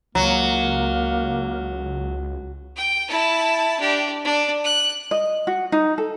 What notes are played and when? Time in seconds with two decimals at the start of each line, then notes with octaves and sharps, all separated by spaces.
0.15 C#2 F#3 A#3
2.76 G5
3.08 E4 A5
3.79 D4 G4
4.24 D4
4.64 F#6
5.11 D#5
5.47 F#4
5.72 D#4
5.98 A4